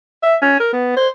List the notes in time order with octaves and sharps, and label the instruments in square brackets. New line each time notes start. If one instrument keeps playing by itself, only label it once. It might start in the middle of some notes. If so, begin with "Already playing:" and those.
[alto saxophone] E5
C#4
A#4
B3
C5